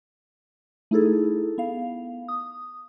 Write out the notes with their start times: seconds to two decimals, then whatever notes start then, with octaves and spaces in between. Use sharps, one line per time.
0.91 A3 D#4 E4 G#4 A4
1.58 B3 F5
2.28 D#6